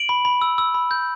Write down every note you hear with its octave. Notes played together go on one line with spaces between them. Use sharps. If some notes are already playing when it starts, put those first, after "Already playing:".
Already playing: D7 F#7
B5
B5
E6
E6
B5
G6